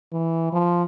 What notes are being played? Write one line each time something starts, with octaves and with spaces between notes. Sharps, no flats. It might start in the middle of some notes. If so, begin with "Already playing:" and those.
E3
F3